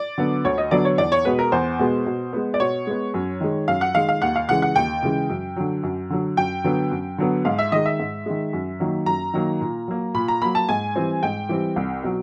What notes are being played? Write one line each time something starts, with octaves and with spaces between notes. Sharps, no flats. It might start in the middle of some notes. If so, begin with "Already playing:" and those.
Already playing: D5
D3 F#3 B3
D2 C#5
D#5
D3 F#3 B3 D5
C#5
E2 D5
C#5
B2 G#3 B3 B4
A#4
E2 C5
B2 G#3 B3
B2
G#3 B3
D5
B2 C#5
G#3 B3
F#2
D#3 G#3
F#2 F5
F#5
D#3 G#3 F5
F5
D#2 F#5
F5
C#3 E3 G#3 F#5
F#5
D#2 G5
C#3 E3 G#3
F#2
D3 F#3
F#2
D3 F#3
F#2 G5
D3 F#3 B3
F#2
D3 F#3 B3
G#2 F5
E5
D#3 G#3 D#5
E5
G#2
D#3 G#3
F#2
D#3 F#3 A#3
F#2 A#5
D#3 F#3 A#3
A#2
F#3 A#3
A#2 B5
A#5
F#3 A#3 B5
A5
G#2 G#5
E3 G3 C4
G#2 G5
E3 G3 C4
C2
B2 F#3